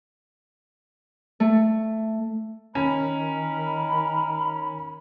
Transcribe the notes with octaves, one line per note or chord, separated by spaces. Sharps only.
A3
D#3 C#4 A#4 B5